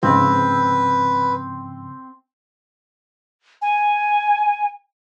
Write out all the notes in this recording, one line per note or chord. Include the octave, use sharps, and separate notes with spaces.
G#2 C#3 F3 C4 B4
G#5